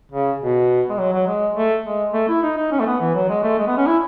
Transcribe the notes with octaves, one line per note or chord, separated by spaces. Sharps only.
C#3
B2
G#3
F#3
F#3
G#3
A3
G#3
A3
E4
D#4
D#4
C#4
A3
B3
E3
F#3
G#3
A3
G#3
B3
C#4
E4